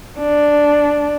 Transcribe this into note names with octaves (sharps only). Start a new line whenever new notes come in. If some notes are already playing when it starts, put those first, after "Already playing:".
D4